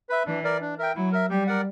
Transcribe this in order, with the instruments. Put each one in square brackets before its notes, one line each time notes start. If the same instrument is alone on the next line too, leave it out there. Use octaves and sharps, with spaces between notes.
[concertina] B4 E5
[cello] E3 [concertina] D4
[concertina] A#4 D5
D4
A#4 E5 G5
[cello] F#3 [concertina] E4
[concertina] A#4 E5
[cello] G3 [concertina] G4
[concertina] A#4 D5 F#5